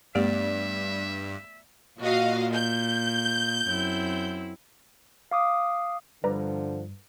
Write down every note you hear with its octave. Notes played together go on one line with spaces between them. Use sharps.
G2 A3 B3 G4 D5 E5
A#2 F#4 D#5 F5
G6
F#2 C4 E4
F5 D6 D#6
G2 D3 F3 B4 D5 A#5